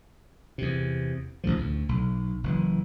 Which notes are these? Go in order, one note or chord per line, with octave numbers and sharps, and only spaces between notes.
E2 C3
A1 D#2 A2 F3
D2
B1
F#1 C3 E3